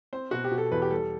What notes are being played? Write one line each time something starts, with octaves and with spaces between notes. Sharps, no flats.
C4 C5
B2 F#4
G4
B2
A4
E2 B4
G4
G3 A4